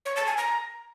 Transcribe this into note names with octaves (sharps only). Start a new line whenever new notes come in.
C#5
A5
G#5
A#5